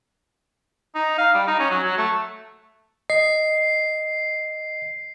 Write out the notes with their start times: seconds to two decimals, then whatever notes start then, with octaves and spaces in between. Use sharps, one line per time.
0.95 D#4
1.18 F5
1.34 G3
1.47 D#4
1.59 C#4
1.70 F#3
1.84 F#3
1.97 A3
3.10 D#5 C7